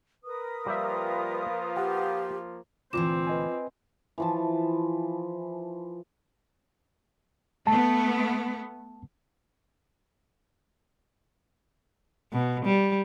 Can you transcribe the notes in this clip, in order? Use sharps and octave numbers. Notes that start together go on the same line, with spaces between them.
A#4 B4 D#6
F3 G3 A#3 F4 G4 E5
G4 F#5
D2 A#2 E3 C4 F4 D6 E7
B4 D#5 G#5
E3 F3 A5
A3 B3 A5
B2
G3